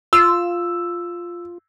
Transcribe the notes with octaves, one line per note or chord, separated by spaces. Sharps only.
F4 E6